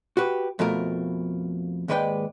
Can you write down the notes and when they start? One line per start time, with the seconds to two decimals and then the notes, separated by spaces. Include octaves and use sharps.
0.17 F#4 G4 B4
0.59 F2 B2 A3 A#4
1.88 D#2 G#2 G#3 B4 D5 G5